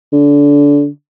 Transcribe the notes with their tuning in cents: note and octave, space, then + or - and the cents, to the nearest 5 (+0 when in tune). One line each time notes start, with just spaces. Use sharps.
D3 -25